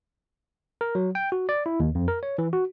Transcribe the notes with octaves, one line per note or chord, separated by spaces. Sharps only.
A#4
F#3
G5
F#4
D5
E4
D#2
F2
A#4
C#5
E3
F#4